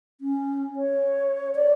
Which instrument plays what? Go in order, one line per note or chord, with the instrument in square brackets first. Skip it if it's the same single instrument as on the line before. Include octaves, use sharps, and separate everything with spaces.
[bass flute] C#4
C#5
D5